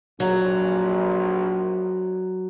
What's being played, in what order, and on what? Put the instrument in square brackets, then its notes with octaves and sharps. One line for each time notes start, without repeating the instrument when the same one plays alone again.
[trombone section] A#1 [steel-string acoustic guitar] F#3